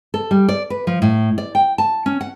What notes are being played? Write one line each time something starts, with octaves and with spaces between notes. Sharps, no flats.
A4
G3
D5
B4
F3
A2
D5
G5
A5
C#4
F#5